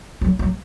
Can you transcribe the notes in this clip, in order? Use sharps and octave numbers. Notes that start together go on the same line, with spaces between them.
F#3
F#3